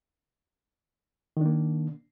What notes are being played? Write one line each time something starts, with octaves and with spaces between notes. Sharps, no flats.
D#3 A#3 D4